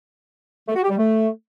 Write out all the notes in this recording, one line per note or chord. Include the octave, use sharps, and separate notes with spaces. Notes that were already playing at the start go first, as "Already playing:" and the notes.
A3
F#4
G4
G3
A3